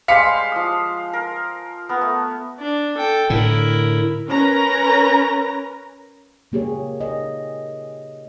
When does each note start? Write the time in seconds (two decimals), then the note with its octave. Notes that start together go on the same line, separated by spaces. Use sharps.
0.08 G3 G#3 C5 F5 B6 C#7
0.52 F3 D#6
1.13 A#4
1.89 B3 A#4
2.01 A3
2.60 D4
2.97 A4 G5
3.30 A2 D3 E4 A#4
4.28 C#4 A#4 B4 A#5
6.52 C#3 A#3 G4 G#4 C#5
7.01 D#5